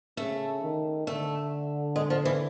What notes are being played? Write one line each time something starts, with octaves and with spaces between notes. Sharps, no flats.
C#3 A3
D#3
D3 A3
G#3
F3
E3